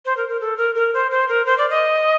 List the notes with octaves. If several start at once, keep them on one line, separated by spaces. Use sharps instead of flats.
C5
A#4
A#4
A4
A#4
A#4
C5
C5
A#4
C5
D5
D#5